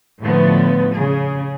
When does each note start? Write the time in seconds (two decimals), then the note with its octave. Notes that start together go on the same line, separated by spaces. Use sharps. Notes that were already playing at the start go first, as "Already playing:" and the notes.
0.21 A2 D3 F3 A3 B3
0.97 C#3 G#4